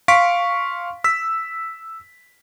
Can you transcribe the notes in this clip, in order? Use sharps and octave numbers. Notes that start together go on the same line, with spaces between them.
F5 C6 C#6 B6 D7
E6 B6